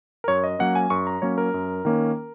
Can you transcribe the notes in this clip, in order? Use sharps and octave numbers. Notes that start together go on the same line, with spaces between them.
A#4
F#2 C#5
D#5
F#3 A#3 C#4 F#5
G#5
F#2 C#6
A#5
F#3 A#3 C#4 C#5
A#4
F#2
D#3 A#3 C#4